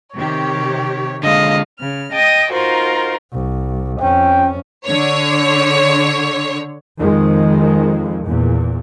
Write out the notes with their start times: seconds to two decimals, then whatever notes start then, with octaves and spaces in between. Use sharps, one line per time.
0.15 C3 D#3 G4 C#5
1.23 D3 G#3 D#5 F5
1.80 C#3 F6
2.12 D#5 G5 A5 D#6
2.53 D#4 F4 F#4 A#4 C5
3.32 C2
4.01 F2 C#4 G5
4.86 D3 C#5
7.00 F2 D#3 G#3
8.27 E2 A#2